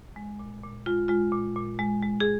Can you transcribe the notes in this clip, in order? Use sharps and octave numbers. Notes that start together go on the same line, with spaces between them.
G#3
A#2
A#2
G#3 F4
G#3 F4
A#2
A#2
G#3
G#3
G#4